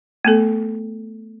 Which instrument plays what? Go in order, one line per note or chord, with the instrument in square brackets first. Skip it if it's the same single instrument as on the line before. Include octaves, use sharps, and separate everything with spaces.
[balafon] A3 B3 A4